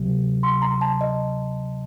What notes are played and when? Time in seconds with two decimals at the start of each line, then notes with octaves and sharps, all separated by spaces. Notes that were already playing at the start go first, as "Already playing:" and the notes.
Already playing: D2 C3 F#3
0.43 C6
0.62 A#5
0.81 A5
1.01 D#5